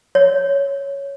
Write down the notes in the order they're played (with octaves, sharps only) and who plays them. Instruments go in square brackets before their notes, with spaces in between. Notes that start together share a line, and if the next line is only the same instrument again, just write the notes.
[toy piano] C#5